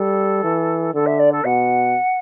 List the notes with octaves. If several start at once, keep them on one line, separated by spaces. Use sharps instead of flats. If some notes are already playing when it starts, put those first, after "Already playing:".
Already playing: G3 A4
E3
D3 A4
E5
D5
A4
B2 F#5